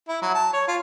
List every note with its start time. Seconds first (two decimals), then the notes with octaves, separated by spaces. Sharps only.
0.08 E4
0.22 F#3
0.35 A5
0.53 C#5
0.68 F4